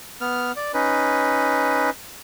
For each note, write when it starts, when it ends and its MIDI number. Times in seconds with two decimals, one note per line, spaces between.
0.21 0.52 59
0.21 0.52 89
0.56 0.72 74
0.74 1.90 61
0.74 1.90 63
0.74 1.90 71